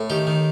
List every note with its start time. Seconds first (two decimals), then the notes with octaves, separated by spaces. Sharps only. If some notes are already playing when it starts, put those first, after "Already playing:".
Already playing: A2
0.10 D#3 G4
0.27 D#3